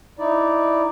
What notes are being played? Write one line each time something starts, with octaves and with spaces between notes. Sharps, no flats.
D#4 E4 D5